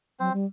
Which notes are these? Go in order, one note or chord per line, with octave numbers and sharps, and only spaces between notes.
F#3 C4 C5
G3